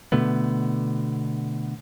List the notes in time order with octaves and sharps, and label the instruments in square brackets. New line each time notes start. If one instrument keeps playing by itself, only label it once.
[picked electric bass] B2 D3 A3 B3